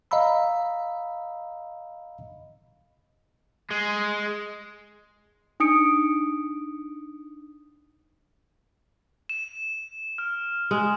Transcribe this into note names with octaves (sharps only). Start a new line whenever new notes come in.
D#5 F5 A#5 B5 E6
G#3
D4 D#4 D#6 C#7 D7
E7
F6
G#3